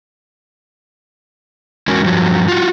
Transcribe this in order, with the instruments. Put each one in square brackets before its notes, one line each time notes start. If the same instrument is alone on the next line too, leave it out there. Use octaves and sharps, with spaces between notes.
[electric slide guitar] E2 G#3 C#4 F#4 A#4
G2 F3 F#3
F4 F#4